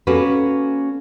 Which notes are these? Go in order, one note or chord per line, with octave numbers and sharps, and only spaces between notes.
A#3 C#4 F#4 A4 B4